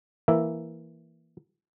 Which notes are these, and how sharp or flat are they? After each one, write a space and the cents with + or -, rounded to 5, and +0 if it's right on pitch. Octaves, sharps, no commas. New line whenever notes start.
E3 +0 A#3 -5 E5 +0